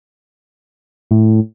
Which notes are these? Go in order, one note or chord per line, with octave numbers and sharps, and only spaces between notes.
A2